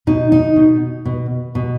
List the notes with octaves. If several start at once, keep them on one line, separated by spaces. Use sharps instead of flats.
B2 D#4
D#4
B2
B2
B2